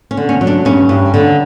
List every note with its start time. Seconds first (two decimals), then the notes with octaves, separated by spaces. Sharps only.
0.11 C#4
0.17 D3
0.29 C#4
0.41 F#3
0.47 D4
0.65 G2 C#4
0.89 G2
1.14 D3